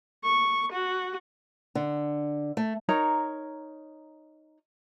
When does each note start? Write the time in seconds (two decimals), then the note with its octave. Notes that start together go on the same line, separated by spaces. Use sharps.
0.24 C#6
0.73 F#4
1.75 D3
2.57 A3
2.89 D#4 A#4 C#5 A#5